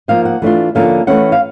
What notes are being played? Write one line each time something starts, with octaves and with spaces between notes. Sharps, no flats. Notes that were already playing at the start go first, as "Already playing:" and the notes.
F3 A#3 D#4 F5
F#5
E3 A3 D4 F4
D3 F3 A#3 C#4 E4 F5
E3 A3 C#4 E4 F#5
F5